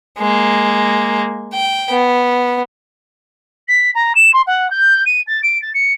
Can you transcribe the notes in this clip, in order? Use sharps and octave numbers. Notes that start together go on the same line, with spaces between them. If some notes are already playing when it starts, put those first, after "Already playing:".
G#3 A#3
G5
B3
B6
A#5
E7
C6
F#5
G6
D#7
A6
D7
A6
C#7